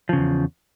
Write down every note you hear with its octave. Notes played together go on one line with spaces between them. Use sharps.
E2 C#3 F3